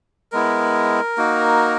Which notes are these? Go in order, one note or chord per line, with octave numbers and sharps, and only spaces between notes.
G#3 B3 E4 A#4
A#3 D#4 F#4